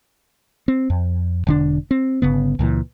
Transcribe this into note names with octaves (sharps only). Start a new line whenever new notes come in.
C4
F2
E1 D3 D4
C4
G1 C#3 B3
C#2 A#2 E3